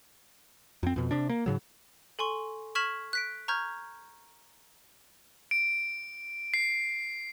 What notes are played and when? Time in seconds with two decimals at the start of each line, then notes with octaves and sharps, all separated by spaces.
0.83 F2 C4
0.96 F2 B2
1.11 C3 D4
1.30 A#3
1.46 G#2 C#3 F#3
2.19 A4 G#5 C6 C#6
2.75 C#6 F6 G#6 B6 E7 F#7
3.13 F#6 B6 D7
3.48 A#5 C#6 F6 G6 G#6
5.51 D7
6.54 C7